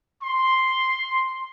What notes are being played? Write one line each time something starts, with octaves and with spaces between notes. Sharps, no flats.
C6